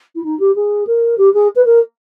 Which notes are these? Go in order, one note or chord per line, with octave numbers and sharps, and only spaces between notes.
E4
D#4
G4
G#4
A#4
G4
G#4
B4
A#4